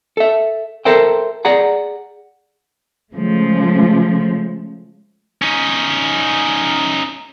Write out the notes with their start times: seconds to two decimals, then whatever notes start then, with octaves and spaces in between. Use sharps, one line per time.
0.17 A4 E5
0.85 A4 A#4 C5 E5 G5
1.45 G#4 D5 F#5 A#5
3.13 C#3 F3 G#3 A3
5.42 C#4 D#4